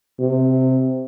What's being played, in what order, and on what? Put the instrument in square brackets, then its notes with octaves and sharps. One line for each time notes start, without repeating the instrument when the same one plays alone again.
[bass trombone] C3